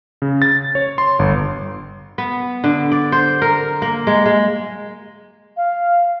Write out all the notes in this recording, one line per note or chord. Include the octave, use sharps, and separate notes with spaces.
C#3
A6
C#5
C6
G1
B3
D3
D5
C5
A#4
A#3
G#3
G#3
F5